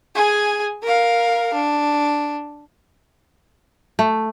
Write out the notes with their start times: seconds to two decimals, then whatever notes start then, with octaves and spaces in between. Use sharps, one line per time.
0.15 G#4 G#5
0.83 A#4 F5
1.53 D4
3.99 A3